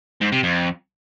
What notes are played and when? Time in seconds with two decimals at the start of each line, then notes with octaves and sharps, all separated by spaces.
0.21 G#2
0.32 C3
0.43 F2